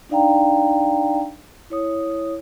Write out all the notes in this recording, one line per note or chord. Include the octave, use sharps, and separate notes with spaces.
D4 D#4 D5 F5 G5 A#5
E4 C#5 D#6